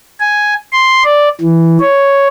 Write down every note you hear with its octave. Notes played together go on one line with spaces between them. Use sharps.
G#5
C6
D5
E3
C#5